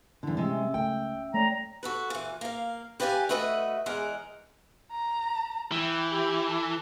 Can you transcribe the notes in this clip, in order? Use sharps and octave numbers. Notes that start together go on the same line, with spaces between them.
E2 D3 G3 E4
C3 G#3 C#4 E5 E6
C#2 A3 G5
A3 C#5 D5 G5 A#5
F#4 A4 B4
A#2 E3
A#3 F5
G4 B4 D5 F5 G5 G#5
A3 F#4 B4 D#5 E5
E2 G#3 A#4 D#5 F#5
A#5
E3 G5
G4
A4